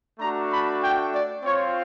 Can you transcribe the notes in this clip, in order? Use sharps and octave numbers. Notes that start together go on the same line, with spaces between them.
A3 D4 F#4 A#5
B5
G5
D5
C4 F4 C#5